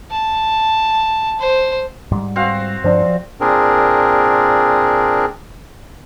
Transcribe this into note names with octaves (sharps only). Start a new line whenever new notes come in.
A5
C5
G#2 G3
C4 F#4 F5
G2 F3 D4 C5 D5
F3
A#2 C4 D4 G#4 A#4